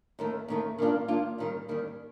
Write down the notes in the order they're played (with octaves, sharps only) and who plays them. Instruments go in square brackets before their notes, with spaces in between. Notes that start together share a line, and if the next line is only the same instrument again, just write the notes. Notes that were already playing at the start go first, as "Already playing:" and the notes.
[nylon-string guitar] D#2 D#3 A3
D#2 D#3 A3
D#3 A#3 D4 F4
D#3 A#3 D4 F4
D#2 D#3 G3
D#2 D#3 G3